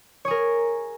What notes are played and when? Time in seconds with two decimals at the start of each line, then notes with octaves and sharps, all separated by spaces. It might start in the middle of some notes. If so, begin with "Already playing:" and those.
0.25 C#5
0.28 G#4
0.31 A#4